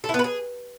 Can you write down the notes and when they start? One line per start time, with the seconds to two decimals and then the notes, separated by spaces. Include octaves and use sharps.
0.04 A4
0.09 E4
0.14 B3
0.19 B4
0.24 G#4